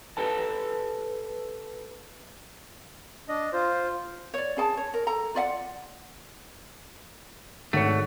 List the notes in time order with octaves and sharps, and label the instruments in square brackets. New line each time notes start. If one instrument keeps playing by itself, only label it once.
[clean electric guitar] G4 A4 B4 A5
[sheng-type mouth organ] D4 D#5
F4 C5
[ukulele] C#5 D5
C#4 G#4 A5
C#5
A#4
A4 A#5
F4 D5 E5 F#5
[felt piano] G#1 C#5 C#7 [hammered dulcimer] D3 F#4 [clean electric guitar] A3